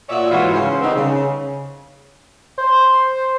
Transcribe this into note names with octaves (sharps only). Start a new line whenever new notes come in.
A#2 F#4 C#5 D5 E5
G#2 E3 F4 F#4 B4 C#5
C#3 C#4 C5
D#3 G3 B3 C4 D#4
C#3
C5